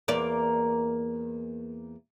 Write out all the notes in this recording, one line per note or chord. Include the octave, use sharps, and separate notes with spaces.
E2 A#3 D5